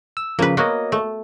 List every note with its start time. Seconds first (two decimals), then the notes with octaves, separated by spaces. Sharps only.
0.17 E6
0.39 C#3 F3 A#3 B4
0.57 A#3 B3 F#4 A#4 C#5 D#5
0.92 A3